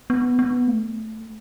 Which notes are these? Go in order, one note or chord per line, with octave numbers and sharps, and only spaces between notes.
B3
B3
A3